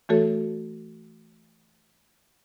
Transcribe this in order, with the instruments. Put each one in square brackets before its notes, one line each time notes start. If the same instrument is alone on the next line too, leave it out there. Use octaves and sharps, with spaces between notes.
[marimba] E3 A3 F#4 A4 C#5